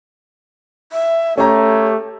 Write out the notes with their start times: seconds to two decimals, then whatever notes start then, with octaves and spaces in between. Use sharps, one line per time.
0.92 E5
1.38 A3 C#4 G4 A#5